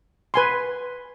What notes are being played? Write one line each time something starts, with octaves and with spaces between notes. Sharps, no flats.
B4 G#5 C6